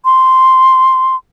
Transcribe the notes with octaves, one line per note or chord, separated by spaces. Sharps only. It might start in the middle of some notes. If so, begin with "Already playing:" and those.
C6